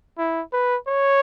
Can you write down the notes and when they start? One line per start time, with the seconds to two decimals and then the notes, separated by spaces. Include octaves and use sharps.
0.18 E4
0.53 B4
0.88 C#5